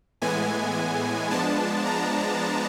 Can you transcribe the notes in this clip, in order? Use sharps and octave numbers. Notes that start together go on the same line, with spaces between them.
A2 E3 G#3 B3 G#5
F3 G#3 B3 D4 A5
A#5